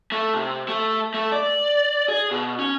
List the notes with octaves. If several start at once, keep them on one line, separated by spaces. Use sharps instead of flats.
A3
C3
A3
A3
D5
G#4
B2
C#4